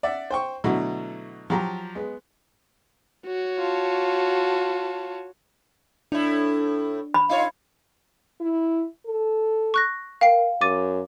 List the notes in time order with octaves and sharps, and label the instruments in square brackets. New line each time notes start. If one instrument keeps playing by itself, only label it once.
[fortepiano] D5 E5 F#5
C5 G5 C#6
B2 D3 F#3 A3 E4 F#4
F3 F#3 G4 A#5
G#3 B3
[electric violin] F#4 C#5
[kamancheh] F4 A5
[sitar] A2 E4 [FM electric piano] D4
[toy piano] B5
[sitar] D#4 F4 C#5 [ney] F5
[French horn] E4
A4
[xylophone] C#6 F#6 A#6
[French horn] A#4 [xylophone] F5 G5 C7
[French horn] F#2 [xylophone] D6 A6 D#7